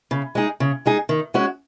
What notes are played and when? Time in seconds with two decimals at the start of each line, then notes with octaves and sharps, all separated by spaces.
0.11 C#3
0.35 G#3 D#4 G#4
0.60 C#3
0.86 G#3 D#4 G#4
1.09 D#3
1.34 G#3 C#4 F#4